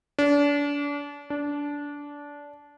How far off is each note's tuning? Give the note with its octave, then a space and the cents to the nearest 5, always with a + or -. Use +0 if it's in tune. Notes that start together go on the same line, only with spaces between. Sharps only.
D4 -35
D4 -20